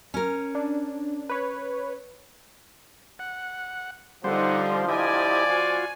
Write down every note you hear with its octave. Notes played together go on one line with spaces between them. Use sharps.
C#4 A#4
D4
B4 C#5
F#5
D3 F3 G3 D#4 C5 F#5
E4 G4 D5 D#5 G#5
F4 F#4